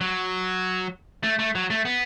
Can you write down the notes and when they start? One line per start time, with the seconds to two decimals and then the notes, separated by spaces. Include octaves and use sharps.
0.01 F#3
1.23 A3
1.39 A3
1.55 F#3
1.70 A3
1.85 B3